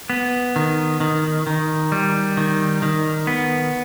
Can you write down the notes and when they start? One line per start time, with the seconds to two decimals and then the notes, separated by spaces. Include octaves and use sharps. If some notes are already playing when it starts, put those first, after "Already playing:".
0.10 B3
0.56 D#3
1.00 D#3
1.47 D#3
1.92 G3
2.37 D#3
2.82 D#3
3.27 B3